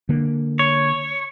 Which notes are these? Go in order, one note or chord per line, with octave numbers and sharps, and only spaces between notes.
D3 A#3
C#5